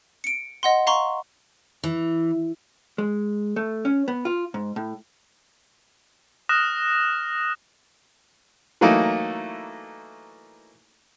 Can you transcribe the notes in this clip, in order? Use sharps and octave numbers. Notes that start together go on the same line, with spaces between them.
C#7 D7
D#5 F#5 C6
F5 A#5 C6 C#6
E3
G#3
A3
C#4
B3
F4
G#2
A2
D#6 F6 F#6 A#6 E7
E3 F#3 A3 A#3 D#4 E4